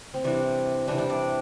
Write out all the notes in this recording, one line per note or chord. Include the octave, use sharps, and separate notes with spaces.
C4
C3 E3 G3 D4
C3 E3 G3 D4
D4
D5